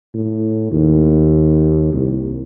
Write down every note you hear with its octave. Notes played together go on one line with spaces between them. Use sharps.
A2
D#2
C2